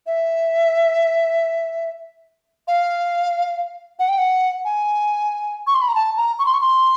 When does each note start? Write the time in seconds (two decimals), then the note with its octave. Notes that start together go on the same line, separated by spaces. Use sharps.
0.07 E5
2.68 F5
3.99 F#5
4.09 G5
4.18 F#5
4.65 G#5
5.67 C#6
5.75 C6
5.82 B5
5.88 A#5
5.95 A5
6.17 A#5
6.39 C#6
6.46 C6
6.54 C#6
6.61 C6